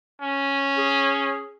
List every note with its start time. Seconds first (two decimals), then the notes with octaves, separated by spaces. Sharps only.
0.21 C#4
0.78 G#4